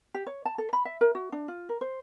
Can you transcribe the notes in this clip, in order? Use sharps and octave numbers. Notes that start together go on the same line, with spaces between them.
G4
C#5
A5
A4
B5
E5
A#4
F#4
D4
F4
A#4
C5